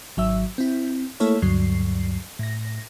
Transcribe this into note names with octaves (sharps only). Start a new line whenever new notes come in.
G#1 F#3 E5 E6
C4 E4
A3 A#3 E4 A4 C#5
D2 G2 F#3 C7
A2 A#6